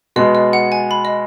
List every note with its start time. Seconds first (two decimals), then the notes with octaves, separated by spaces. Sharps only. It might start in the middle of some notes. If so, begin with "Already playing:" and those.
0.16 B2 G#3 B3 D#5
0.35 D#5
0.53 F#5
0.72 G#5
0.91 B5
1.05 D#5